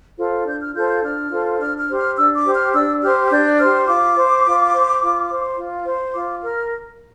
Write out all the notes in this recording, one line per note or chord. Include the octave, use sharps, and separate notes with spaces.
F4 A4 C5
D4 G6
F6
F4 A4 C5 G6
G6
D4 F6
F4 A4 C5
D4 F6
F6
G4 C5
F6
D4 E6
D6
G4 C5
F6
D4 E6
G4 C5 F6
F6
D4 G6
G4 C5 F6
F4 D6
C5
F4
C5
F4
C5
F4
C5
F4 D6
A#4 F6